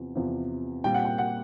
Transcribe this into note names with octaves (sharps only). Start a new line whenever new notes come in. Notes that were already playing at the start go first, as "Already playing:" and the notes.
Already playing: E2 C3 F3
E2 C3 F3
A#2 G3 C4 G5
F#5
G5
F#5